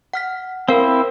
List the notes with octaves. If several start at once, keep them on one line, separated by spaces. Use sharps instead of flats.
F#5 F6 B6
C4 E4 A#4 F5